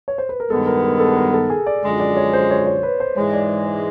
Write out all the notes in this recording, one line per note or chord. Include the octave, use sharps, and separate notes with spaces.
C#5
C5
B4
A#4
G2 D#3 G#3 B3 A4
A#4
A#4
A4
A#4
A4
G#4
D5
F#2 D3 F3 G#3
D5
C#5
C5
C#5
C#5
B4
C5
G#2 E3 G#3 C#5
D5
D5